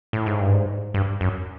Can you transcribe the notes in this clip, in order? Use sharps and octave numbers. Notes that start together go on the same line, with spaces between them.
A2
G#2
G2
G#2
G2
F#2